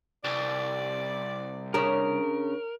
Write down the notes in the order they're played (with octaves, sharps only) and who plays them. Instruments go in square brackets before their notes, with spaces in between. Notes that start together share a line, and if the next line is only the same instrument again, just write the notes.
[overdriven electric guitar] C2 [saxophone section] D5
[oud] C#3 D4 [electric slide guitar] A#4